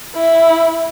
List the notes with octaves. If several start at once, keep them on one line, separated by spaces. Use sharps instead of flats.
E4